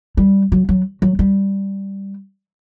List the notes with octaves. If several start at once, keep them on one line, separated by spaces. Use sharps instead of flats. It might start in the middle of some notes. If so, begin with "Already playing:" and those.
G3
F#3
F#3
F#3
G3